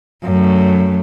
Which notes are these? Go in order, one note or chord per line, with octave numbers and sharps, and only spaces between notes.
F#2 A3